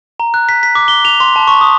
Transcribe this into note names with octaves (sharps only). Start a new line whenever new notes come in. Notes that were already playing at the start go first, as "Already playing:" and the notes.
A#5
F#6
B6
B6
D6
G7
F7
C6
A5
C#6
D#6